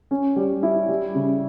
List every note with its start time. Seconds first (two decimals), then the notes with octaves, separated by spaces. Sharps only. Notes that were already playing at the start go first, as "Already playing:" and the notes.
0.11 C#4
0.36 G3
0.63 E4
0.89 G3
1.15 C#3